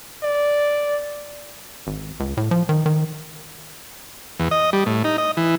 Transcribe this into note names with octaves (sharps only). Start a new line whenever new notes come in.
D5
G#1
C#2
A2
F3
D#3
D#3
E2
D#5
G3
A2
D#4
D#5
E3